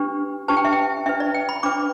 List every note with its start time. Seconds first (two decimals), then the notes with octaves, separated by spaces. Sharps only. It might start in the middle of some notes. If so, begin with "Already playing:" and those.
Already playing: D4 G4 B4
0.48 D4 G4 B4 A5
0.57 G5
0.65 E5
0.72 G5
1.06 D4 B4 E5
1.20 D5
1.34 G5
1.49 B5
1.63 D4 B4 D6